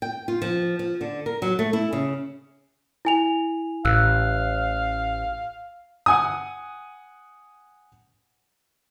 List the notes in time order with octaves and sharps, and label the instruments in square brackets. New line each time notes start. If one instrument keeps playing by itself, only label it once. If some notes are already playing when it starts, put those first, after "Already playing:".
[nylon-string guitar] G5
F4
F3
F3
D3
A#4
F#3
A3
E4
C#3
[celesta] E4 G#5 F7
[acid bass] A1 [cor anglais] F5 [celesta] E6 F#6
[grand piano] F#5 G#5 D#6